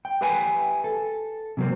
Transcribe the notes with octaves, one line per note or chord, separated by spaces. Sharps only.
G5
G4 B4 E5 G5 G#5
A4
C3 F#3 A#3 C4